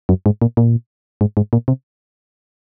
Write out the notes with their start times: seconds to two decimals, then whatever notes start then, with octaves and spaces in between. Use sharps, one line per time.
0.09 F#2
0.26 G#2
0.42 A#2
0.57 A#2
1.21 G#2
1.37 G#2
1.53 A#2
1.68 C3